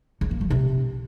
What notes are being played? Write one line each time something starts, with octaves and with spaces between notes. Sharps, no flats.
C#3
A#3
F3
C3